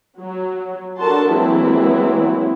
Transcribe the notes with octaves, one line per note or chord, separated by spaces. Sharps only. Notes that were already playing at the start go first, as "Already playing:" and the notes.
F#3
D4 F#4 A4 A#4 A5 C6
E3 F#3 G#3 A#3 C4 E4